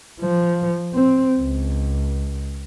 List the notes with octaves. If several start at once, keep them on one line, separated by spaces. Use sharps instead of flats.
F3
C4
C#2